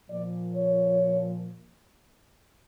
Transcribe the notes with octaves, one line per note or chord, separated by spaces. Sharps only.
A#2 F3 D5
C#5